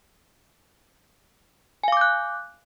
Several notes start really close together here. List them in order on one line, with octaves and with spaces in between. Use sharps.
G#5 F5 D6 G6 F#6